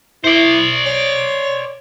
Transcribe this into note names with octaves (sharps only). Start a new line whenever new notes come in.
E4 C5 D5
C#5